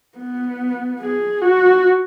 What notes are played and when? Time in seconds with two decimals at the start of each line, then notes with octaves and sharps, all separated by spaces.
0.18 B3
1.00 G#4
1.41 F#4